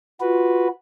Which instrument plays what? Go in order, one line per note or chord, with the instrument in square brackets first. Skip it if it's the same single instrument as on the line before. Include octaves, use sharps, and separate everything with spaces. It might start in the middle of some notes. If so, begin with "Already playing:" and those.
[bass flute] F4 [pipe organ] F#4 B4